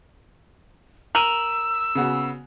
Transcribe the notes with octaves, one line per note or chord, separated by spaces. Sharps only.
A#4 E6 D#7 F#7
C#3 B3 F#4